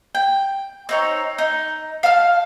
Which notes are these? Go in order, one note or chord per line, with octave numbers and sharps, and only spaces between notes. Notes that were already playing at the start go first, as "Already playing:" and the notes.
G5
C4 D#4 C#5
D#4
F5 A5 F6